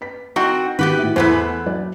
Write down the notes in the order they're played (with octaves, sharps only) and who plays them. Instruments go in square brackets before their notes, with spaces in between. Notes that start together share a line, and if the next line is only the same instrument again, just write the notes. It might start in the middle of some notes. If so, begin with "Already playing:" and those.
[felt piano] B4 B6
[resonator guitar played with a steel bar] C4 F#4 F#5 [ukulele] D#4 A#4
[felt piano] D#3 [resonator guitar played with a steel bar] B3 G4 B4 [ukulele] F#4
[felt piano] A2 E5
[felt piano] E2 [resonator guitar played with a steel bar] E3 A3 B3 [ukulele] E4 B4 C5
[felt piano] F#3 D5